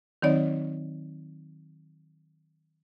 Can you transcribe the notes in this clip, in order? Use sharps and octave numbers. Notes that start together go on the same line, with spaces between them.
D#3 F#3 C4 D#4 C#5 D5